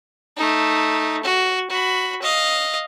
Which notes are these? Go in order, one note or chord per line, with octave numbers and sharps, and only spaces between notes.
A3 D#4
F#4
F#4 B5
D#5 F5